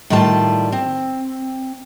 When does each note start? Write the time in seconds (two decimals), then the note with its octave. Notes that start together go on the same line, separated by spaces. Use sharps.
0.10 A2 D#3 G3 F4 A5
0.72 C4